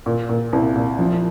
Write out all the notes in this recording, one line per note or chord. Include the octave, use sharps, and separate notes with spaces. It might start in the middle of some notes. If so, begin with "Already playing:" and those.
A#2
A#2
C2
A#2
F3